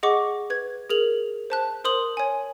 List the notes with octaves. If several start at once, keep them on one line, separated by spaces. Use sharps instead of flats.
G#4 D#5 F#5 C#6 D6
B4 G#6
G#4 A#4 F7 F#7
C5 A5 F#6
A#4 C5 C6 D#6 F#7
C#5 G#5